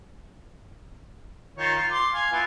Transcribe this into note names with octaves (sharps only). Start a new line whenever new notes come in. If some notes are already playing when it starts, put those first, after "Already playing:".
D#3 F4 C#5
F4
C6 D6
F5 G#5
B3 E4 F4